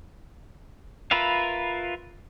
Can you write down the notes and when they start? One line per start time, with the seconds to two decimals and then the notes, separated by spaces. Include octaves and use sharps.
1.11 F4 A#4 B4 E5 F5